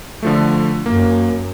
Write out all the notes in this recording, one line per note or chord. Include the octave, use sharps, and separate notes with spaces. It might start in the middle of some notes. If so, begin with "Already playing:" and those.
D3 F3 A3
F#2 A#3